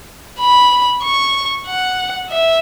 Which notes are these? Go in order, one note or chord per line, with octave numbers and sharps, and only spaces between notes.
B5
C#6
F#5
E5